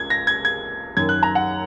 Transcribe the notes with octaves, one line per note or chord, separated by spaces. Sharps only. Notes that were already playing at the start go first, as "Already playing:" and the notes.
Already playing: C#2 G#6
A#6
G#6
G#6
F#2 D#3 G#6
F#6
A#5
F#5